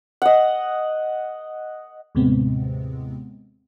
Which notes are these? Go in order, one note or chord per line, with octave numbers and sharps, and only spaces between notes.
D#5 F#5
D#2 A2 C3 G#3 B3 C4